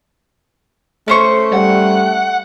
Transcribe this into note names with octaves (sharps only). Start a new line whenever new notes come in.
A3 C#4 C5 C#6
G3 F#5